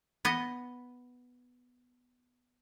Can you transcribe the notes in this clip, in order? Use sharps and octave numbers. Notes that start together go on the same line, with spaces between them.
B3 D#5